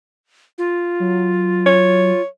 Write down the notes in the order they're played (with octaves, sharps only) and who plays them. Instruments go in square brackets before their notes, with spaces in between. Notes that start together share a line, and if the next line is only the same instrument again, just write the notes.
[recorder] F4
[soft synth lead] F#3
[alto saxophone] C#5